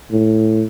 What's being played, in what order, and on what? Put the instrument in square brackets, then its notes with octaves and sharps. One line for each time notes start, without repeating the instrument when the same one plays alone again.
[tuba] A2